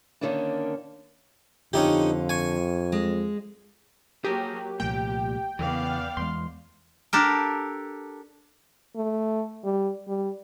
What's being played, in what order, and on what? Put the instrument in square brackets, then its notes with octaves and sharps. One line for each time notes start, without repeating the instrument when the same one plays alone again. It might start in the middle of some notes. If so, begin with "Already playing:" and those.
[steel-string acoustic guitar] D3 D#3 G3 A#3 C#4 D4
[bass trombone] F2 [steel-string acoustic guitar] D3 F4 [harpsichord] C#4 D#4 G4
[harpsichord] G#5 C#6
[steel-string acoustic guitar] G#3
[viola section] F#3 A#3 [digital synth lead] G4 [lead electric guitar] G#4 A#4
[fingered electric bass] C2 F3 A3 [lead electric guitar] A#2 [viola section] G4 [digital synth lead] G5
[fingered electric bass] E2 [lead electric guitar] C#3 E3 [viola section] B3 D5 F5
[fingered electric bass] E2 E3 G#3 [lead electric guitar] C6
[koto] D4 G4 A4 A#4
[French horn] A3
G3
G3